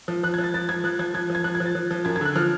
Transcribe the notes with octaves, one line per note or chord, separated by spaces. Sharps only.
F3
F3 F#6
G#6
F3
A6
F3 A6
F3 G#6
F3 F#6
F3 G#6
F3 G#6
F3
G#6
F3 F#6
G#6
F3
A6
F3
F3
F#2 G#6
G#6
D3 F#6
F3 F6